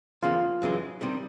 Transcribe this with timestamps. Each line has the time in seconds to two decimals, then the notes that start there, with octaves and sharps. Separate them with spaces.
0.22 E2 C#3 F3 A#3 F4
0.62 F#2 C#3 E3 G#3
1.01 C3 D#3 G3